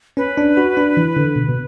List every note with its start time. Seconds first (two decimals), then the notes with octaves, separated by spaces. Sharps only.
0.17 C#4 B4
0.37 D4
0.57 F#4
0.77 D4
0.97 E3
1.17 D3
1.36 B2
1.49 B2